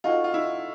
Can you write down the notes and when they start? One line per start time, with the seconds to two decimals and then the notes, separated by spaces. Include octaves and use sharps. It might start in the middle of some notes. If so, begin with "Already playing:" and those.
0.04 D#4 F4 F#4 A4 C#5
0.24 F4
0.34 E4